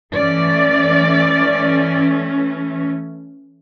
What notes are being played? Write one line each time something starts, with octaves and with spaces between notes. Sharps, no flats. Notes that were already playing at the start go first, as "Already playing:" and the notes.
E3 A3 C#4 D5